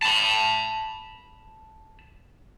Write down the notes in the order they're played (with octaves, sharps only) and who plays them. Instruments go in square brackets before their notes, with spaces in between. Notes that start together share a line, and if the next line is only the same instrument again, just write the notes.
[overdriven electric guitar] A5 B5